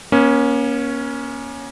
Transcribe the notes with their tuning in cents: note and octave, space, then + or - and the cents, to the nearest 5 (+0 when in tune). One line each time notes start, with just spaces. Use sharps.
A#3 +40 C#4 +0